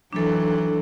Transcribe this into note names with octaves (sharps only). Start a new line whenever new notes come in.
E3 F#3 D4 A4